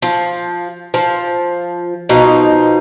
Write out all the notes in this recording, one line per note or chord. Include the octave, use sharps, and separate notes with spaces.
F3
F3
B2 F3 D#4